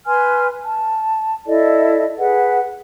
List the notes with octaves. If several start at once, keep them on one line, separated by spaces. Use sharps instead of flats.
B4 G#5 C6 F6
A5
E4 A4 D5 D#5
G#4 B4 F#5